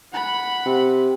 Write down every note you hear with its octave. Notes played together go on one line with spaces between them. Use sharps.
F#5 B5
C3